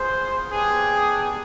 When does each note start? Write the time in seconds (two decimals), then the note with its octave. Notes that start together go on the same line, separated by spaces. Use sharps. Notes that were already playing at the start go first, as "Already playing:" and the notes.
Already playing: B3 F4 G#4 C5
0.51 B3 D4 G4 G#4